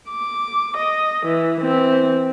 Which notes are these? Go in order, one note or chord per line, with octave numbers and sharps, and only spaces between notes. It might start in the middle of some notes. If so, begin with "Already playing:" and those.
D6
D#5
E3
E3 C4